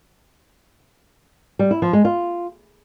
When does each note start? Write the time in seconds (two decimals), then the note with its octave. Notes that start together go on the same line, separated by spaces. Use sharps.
1.59 G3
1.71 E4
1.82 F3
1.93 G#3
2.05 F4